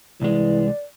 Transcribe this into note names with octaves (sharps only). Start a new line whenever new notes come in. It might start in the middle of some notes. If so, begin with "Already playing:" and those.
C2 E3 G#3 D5